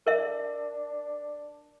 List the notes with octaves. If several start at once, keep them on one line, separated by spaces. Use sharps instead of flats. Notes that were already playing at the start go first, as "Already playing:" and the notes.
D4 A#4 E5